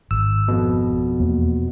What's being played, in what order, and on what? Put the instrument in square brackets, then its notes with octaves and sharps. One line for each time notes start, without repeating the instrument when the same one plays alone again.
[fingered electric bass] G#1 [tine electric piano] E6
[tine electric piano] F2 B2
[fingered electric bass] E2 A#3